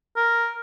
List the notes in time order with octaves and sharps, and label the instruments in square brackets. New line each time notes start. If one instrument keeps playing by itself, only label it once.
[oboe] A#4